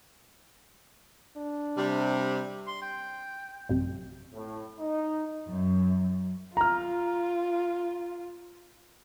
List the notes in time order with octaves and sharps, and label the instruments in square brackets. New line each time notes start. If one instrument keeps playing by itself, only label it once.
[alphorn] D4
[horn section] C3 G3
[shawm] C6
G5
[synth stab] A1 F#2 C3
[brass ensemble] A2
D#4
[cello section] F#2
[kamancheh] F4 [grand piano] A#5 F6